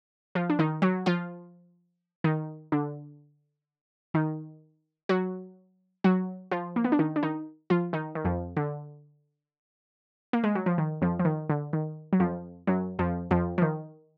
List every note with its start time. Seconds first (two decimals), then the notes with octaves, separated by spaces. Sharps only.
0.35 F3 F4
0.50 D4
0.59 D#3 D#4
0.82 F#3 F#4
1.06 F3 F4
2.24 D#3 D#4
2.72 D3 D4
4.14 D#3 D#4
5.09 F#3 F#4
6.04 F#3 F#4
6.51 F3 F4
6.76 A#3
6.84 B3
6.92 D4
6.99 D#3 D#4
7.16 D4
7.23 D#3 D#4
7.70 F3 F4
7.93 D#3 D#4
8.15 D#3
8.25 F2 F3
8.57 D3
10.33 A#3
10.44 G#3
10.55 F#3
10.66 F3
10.78 D#3
11.02 F2 F3
11.19 F3
11.25 D#3
11.49 D3
11.73 D#3
12.13 F#3
12.20 F2 F3
12.67 F#2 F#3
12.99 F2 F3
13.31 F2 F3
13.58 F3
13.62 D#3